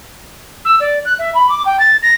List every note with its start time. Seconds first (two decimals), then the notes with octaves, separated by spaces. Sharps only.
0.65 E6
0.80 D5
1.05 F#6
1.19 E5
1.34 B5
1.49 D6
1.65 G5
1.79 A6
2.02 A#6